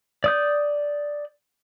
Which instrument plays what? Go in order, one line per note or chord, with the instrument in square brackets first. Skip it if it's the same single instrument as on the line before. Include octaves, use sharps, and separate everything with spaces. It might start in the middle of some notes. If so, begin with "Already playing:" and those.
[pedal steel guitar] D5 D#6 G6